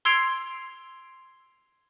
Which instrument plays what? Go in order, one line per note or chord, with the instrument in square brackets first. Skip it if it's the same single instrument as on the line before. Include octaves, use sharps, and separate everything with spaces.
[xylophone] C6 E6 G#6 C7 D7 F7